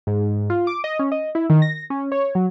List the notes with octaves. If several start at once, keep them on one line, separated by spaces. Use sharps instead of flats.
G#2
F4
D6
D#5
C#4
D#5
E4
D#3
A#6
C#4
C#5
F#3